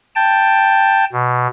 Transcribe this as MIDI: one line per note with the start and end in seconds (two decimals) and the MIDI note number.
0.16 1.05 79
0.16 1.05 81
1.13 1.48 47